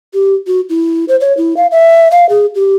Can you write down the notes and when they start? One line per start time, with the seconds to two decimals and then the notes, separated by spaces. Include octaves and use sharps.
0.14 G4
0.47 F#4
0.70 E4
1.08 C5
1.21 C#5
1.37 E4
1.57 F5
1.72 E5
2.11 F5
2.29 G#4
2.55 G4